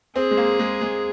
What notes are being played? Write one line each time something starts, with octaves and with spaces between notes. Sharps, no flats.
C4 G#4
G#3
A#3
G#3
G#3